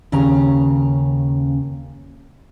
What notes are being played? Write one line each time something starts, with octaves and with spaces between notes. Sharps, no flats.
D#2 C#3 C#4 F5 A#5